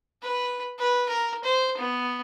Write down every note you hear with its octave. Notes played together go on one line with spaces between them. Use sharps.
B4
B4
A#4
C5
B3